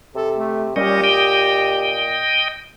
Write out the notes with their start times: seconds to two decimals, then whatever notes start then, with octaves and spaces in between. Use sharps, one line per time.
0.15 C3 A4
0.37 A3
0.76 A#2 G3 C#4 G4 D#5
1.04 D#5 G5